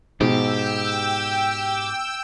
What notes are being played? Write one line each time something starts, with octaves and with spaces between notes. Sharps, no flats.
G#2 B2 G4 G5 E6